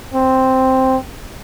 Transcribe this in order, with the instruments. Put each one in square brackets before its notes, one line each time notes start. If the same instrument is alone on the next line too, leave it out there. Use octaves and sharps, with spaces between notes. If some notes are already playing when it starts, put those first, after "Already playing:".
[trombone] C4